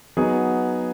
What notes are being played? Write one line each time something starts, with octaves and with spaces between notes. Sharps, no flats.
F#3 B3 D#4 G#4